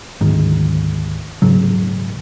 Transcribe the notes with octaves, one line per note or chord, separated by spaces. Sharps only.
G#1 D2 G#2 D#3
D#1 G#2 C#3 F#3